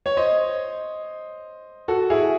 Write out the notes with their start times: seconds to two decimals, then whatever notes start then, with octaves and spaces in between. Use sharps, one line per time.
0.06 C#5
0.17 C5 D#5
1.88 F#4 A4
2.10 E4 G#4